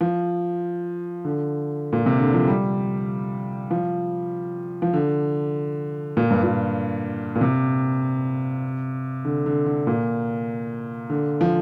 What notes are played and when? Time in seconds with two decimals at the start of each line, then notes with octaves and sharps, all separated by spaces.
0.01 F3
1.25 D3
1.93 A#2
2.06 C3
2.20 D3
2.34 F3
2.48 G3
3.71 F3
4.82 F3
4.93 D3
6.17 A#2
6.30 G2
6.43 A#2
7.35 A#2
7.41 C3
9.25 D3
9.46 D3
9.66 D3
9.87 A#2
11.10 D3
11.41 F3